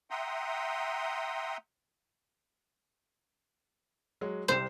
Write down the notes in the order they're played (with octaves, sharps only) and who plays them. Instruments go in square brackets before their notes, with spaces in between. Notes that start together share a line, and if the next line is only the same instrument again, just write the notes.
[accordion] E5 F#5 G5 A#5 C6 D#6
[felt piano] F#3 G#3
[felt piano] C2 C3 E7 [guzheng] C5